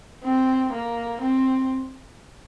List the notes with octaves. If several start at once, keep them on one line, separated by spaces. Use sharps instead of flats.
C4
A#3
C4